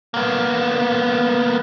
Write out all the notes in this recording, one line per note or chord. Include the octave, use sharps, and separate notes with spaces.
A#3 B3